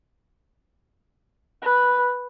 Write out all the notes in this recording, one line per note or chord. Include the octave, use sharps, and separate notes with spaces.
B4